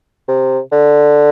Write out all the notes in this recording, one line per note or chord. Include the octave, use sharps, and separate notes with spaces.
C3
D3